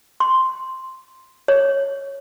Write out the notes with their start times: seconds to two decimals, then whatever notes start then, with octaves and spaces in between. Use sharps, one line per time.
0.20 C6
1.48 C#5